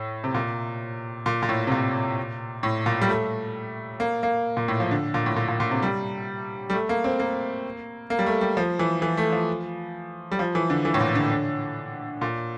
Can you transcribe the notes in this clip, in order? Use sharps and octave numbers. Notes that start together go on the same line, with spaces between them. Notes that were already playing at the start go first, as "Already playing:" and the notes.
Already playing: A2
C3
A#2
A#2
A#2
A2
C3
A#2
A2
A#2
G3
A3
A#3
A#3
A#2
A2
F3
D3
A#2
A2
A#2
A#2
A#2
C3
G3
G3
A3
A#3
C4
A#3
A#3
G3
A3
G3
F3
E3
E3
A3
F3
G3
F3
E3
D3
E3
A2
A#2
D3
D3
A#2